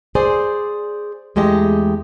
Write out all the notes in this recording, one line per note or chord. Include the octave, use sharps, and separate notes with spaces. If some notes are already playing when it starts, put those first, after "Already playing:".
G#4 C5 D5
E2 G#3 A3 G4 D#5